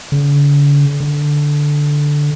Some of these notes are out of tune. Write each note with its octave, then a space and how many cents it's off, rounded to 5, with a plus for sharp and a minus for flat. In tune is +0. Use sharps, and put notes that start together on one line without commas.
D3 -45
D3 -5